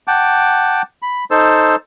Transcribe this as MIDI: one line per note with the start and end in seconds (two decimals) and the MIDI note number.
0.08 0.82 78
0.08 0.82 79
0.08 0.82 81
0.08 0.82 86
1.02 1.24 83
1.31 1.76 63
1.31 1.76 69
1.31 1.76 72
1.31 1.76 88